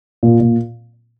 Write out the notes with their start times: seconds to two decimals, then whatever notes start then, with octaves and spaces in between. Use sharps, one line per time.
0.23 A#2
0.40 A#2